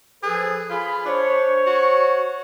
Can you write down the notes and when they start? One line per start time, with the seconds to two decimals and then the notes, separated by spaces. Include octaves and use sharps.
0.23 F3 G#4 A4 B4
0.70 F4 G#4 G#5 B5
1.06 D4 C5 C#5
1.67 F#4